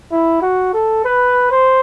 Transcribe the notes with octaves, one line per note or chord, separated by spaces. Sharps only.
E4
F#4
A4
B4
C5